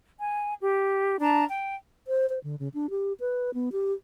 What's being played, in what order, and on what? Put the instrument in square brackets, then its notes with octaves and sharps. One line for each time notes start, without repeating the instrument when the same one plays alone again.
[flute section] G#5
G4
D4 A5 A#5
G5
[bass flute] C5
C5
D3
C#3
D4
G4
B4
B3
G4